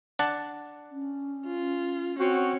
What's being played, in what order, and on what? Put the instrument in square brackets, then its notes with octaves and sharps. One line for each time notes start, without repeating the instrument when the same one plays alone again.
[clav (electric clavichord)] D4 F#5 A5
[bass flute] C#4
[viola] F4
[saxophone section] C4 F#4 [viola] C#4